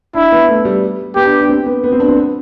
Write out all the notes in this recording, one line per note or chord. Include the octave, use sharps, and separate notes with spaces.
D4 E4
B3
A3
G3
B3 G4
D4
D4
C4
B3
B3
C4
D4
C4
B3